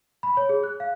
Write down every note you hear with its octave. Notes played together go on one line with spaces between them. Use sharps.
B5
C#5
G#4
F#6
F5